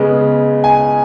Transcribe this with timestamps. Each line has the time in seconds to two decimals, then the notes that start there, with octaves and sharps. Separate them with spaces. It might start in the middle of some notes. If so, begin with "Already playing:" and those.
Already playing: C#3 G#3 B3
0.64 G#5